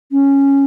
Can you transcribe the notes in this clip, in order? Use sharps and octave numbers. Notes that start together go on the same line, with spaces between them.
C#4